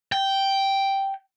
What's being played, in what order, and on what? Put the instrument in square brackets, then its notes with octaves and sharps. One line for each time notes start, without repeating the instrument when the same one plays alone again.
[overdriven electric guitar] G5